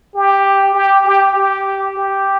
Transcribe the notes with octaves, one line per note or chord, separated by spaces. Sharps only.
G4
G4
G4
G4
G4